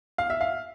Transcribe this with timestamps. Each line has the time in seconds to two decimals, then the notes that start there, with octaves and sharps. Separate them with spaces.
0.18 F5
0.30 E5
0.41 F5